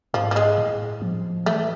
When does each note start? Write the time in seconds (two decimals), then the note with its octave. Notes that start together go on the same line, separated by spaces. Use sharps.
0.14 G#2 F3
0.31 F3
0.36 G#3
0.58 A2
1.02 F3
1.46 E3 A3